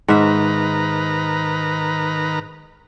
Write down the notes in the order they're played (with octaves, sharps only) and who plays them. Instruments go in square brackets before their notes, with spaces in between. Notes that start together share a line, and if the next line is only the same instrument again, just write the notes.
[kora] G#2 E5 [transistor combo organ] D#3 B4 A#5